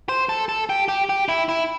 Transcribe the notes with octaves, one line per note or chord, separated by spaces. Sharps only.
C5
A4
A4
G4
G4
G4
E4
E4